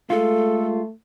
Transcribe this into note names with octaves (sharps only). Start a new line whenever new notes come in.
G#3 A3 F4 A4